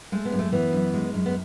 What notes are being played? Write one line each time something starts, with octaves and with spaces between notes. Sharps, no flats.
G#3 A3
B3
F#2
A3
E3 B3
F#2
G#3
F#2
B3